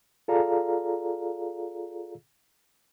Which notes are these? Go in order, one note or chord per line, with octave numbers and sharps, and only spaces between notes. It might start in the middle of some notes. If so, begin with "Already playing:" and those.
F4 G#4 A4 D5 F5 A#5